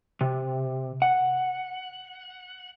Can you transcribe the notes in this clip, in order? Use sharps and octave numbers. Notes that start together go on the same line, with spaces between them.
C3
F#5